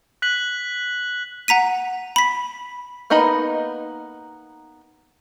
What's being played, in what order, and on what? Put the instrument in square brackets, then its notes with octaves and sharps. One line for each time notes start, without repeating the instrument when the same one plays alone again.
[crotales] F#6 B6 F#7
[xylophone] F#5 A#5 B6 D#7
B5 B6
[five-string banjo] A#3 B3 D#4 D#5 B5